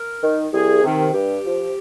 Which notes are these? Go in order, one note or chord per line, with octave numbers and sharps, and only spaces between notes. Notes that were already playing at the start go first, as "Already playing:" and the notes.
Already playing: A#4
D#3
C2 G#4
C3 D#3
G2 G4
F3